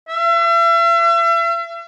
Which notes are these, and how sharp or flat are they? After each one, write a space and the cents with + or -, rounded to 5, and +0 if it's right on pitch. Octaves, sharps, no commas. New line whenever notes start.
E5 +40